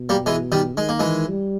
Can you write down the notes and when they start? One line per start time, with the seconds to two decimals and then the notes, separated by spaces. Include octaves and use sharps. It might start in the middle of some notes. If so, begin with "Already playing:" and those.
Already playing: B2
0.09 G3 A#3
0.26 E3 G#3
0.52 D#3 G3
0.77 D#3 G#3
0.89 A#3
1.00 E3 G#3
1.29 G3